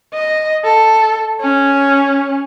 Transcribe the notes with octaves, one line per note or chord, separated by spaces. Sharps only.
D#5
A4
C#4